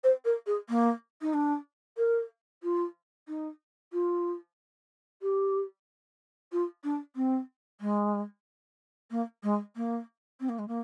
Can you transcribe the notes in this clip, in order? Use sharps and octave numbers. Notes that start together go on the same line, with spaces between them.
C5
A#4
G#4
A#3
D#4
D4
A#4
F4
D#4
F4
G4
F4
D4
C4
G#3
A#3
G#3
A#3
C4
A#3
G#3
A#3